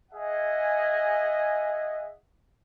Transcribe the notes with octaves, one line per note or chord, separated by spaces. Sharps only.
G#4 D#5 E5 F#5 G#5